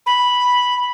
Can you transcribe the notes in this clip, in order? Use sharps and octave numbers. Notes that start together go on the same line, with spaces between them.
B5